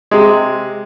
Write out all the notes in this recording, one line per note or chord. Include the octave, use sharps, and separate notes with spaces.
C3 G#3